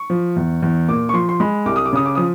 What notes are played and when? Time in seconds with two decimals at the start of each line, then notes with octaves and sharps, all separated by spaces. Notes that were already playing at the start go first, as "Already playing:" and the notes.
Already playing: C#6
0.10 F3
0.36 E2
0.63 E2
0.89 A#2 D6
1.09 C#6
1.13 F3 C6
1.29 C6
1.40 G#3 B5
1.66 C2 D6
1.76 D#6
1.86 D6
1.93 C#3 D#6
2.06 D6
2.15 F3 D#6